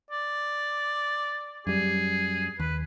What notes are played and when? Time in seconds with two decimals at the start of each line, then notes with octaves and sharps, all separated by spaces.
0.11 D5
1.67 F#2 G3 G#4
2.60 D#2 B4